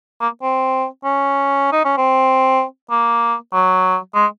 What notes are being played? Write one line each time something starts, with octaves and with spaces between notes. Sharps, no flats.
A#3
C4
C#4
D#4
C#4
C4
A#3
F#3
G#3